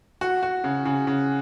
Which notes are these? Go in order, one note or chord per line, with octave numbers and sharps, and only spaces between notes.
F#4
F#4
C#3
C#3
C#3